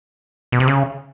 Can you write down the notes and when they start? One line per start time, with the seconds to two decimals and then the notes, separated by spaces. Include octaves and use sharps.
0.52 B2
0.60 C3
0.68 C#3